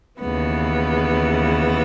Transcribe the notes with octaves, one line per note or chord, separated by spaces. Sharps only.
D#2 C#3 E3 B3